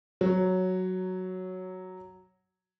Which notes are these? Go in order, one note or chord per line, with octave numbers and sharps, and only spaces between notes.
F#3 C#5